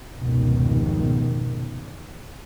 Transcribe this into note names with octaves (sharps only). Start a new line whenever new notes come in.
F1 C#2 G#2 B2 D#3